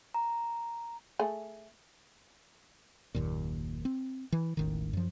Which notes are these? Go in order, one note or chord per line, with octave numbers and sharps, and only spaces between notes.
A#5
A3 G#4
F#1 D#2 A#2
C4
E3
E1 A1 D#3
F#2 F3